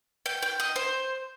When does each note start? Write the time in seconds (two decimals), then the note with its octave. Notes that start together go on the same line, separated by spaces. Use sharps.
0.26 G5
0.42 G5
0.60 D#5
0.76 C5